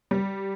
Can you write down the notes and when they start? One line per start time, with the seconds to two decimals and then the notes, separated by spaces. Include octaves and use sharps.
0.11 G3